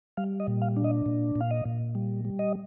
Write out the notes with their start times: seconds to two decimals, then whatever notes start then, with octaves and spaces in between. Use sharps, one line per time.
0.17 G3 F5
0.40 D#5
0.47 A#2
0.62 F5
0.76 D4
0.84 D#5
1.06 A#2
1.36 A#2
1.41 F5
1.51 D#5
1.65 A#2
1.95 G3
2.25 G3
2.39 D#5